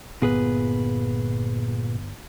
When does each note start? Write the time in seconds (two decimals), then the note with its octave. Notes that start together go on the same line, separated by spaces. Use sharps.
0.22 G1 A#2 B3 G#4 B4